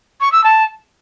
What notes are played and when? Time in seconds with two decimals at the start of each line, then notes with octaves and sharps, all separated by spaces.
0.21 C#6
0.32 E6
0.44 A5